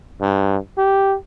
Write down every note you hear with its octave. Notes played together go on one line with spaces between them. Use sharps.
G2
G4